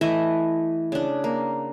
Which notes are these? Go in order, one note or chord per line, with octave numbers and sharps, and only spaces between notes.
E3 A3 D#5 E5
C#3 D4
A#3